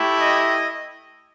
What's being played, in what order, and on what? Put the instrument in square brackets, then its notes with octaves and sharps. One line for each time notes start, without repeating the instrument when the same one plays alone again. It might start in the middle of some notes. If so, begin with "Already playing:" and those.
Already playing: [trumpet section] A3 E4 G4
D#5